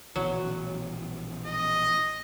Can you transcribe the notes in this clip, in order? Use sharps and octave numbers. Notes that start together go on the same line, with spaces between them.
A#1 B2 E3 F#3
D#5